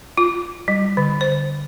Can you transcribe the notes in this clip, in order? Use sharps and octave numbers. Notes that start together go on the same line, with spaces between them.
F4
G3
D3
C5